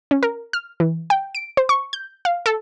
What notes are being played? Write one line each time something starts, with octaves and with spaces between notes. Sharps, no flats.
C#4
A#4
F6
E3
G5
D7
C5
C#6
G6
F5
A4